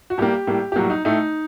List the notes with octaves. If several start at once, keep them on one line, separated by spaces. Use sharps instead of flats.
F#4
A2 G3 A#3 G4
A2 G3 A#3
G4
A2 F#3 G3 A#3 F#4
D#4
A2 A3 D#4